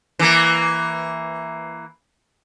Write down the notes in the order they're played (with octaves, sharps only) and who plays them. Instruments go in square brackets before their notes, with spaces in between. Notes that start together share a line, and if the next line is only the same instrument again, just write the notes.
[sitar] E3 A#3